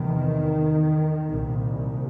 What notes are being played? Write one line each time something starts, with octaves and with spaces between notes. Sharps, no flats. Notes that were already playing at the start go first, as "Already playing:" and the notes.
Already playing: E2 C3 D#3
C2 A#2